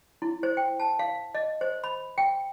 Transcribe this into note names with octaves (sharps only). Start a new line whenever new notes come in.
E4
C5
G5
A5
F5
D#5
C5
B5
G5